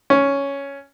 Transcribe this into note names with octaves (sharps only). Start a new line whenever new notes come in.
C#4